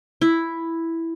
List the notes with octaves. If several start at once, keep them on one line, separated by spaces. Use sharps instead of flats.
E4